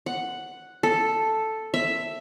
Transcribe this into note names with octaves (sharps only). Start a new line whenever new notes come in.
F#5
A4
E5